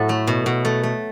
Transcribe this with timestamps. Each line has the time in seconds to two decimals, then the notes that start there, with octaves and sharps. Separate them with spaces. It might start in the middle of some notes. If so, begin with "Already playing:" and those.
Already playing: A2 F#3 E4 F#4 A4
0.09 A3
0.27 B2
0.46 B2
0.65 A3
0.83 A3